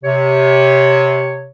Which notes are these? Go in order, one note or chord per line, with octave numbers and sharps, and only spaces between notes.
C3 C#5